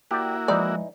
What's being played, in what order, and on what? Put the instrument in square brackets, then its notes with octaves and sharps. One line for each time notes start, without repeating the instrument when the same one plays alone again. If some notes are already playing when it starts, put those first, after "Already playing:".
[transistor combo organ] A#3 E4 F#4 [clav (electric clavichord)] G4 D5
[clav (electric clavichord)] E3 D#4 [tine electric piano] F3 G#3 [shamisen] D5